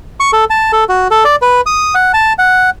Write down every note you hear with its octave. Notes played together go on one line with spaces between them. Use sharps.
C#6
A4
A5
A4
F#4
A4
D5
B4
D#6
F#5
A5
F#5